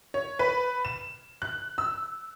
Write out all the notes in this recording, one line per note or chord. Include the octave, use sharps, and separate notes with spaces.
C#5
B4
E7
F#6
E6